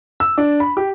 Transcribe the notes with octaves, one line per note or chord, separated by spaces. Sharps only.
E6
D4
B5
G4